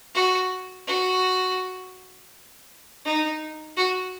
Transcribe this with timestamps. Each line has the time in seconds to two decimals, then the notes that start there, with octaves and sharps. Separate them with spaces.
0.15 F#4
0.87 F#4
3.05 D#4
3.77 F#4